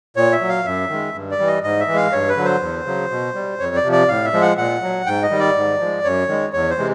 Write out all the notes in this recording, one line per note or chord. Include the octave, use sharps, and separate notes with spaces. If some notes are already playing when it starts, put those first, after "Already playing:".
A#2 C#5
E5
F#3
F5
F#2 E5
D#3 G#3
G2
D5
E3 G3
D#5
G#2 D#5
E5
E3
G#3 F5
G2 C#5
B4
D3 F#3
C5
E2
C#3 F#3
B2
G3
F2 C#5
D5
C3 F3
D5
A2 F5
E5
F3 G#3
F#5
A#2 F#5
F#3
G#2 G5
D#5
D#3 G3
D5
G#2
F3 G#3
F#2 C#5
D#3 G#3
E2 C#5
C5
C3 E3 G#3